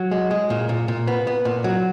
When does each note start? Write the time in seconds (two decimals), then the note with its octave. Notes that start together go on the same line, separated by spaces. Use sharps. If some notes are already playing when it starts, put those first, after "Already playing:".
Already playing: F#3
0.11 G#3
0.31 G#3
0.50 A#2
0.69 A#2
0.88 A#2
1.07 B3
1.27 B3
1.45 A#2
1.64 F#3